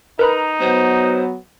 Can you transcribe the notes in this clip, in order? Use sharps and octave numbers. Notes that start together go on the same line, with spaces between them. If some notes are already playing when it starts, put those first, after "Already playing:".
D#4 A#4 B4 A#5 B5
F#3 B3 C5